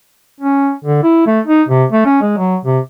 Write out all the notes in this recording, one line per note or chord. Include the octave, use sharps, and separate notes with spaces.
C#4
D3
E4
A3
D#4
C3
A3
C#4
G#3
F#3
C3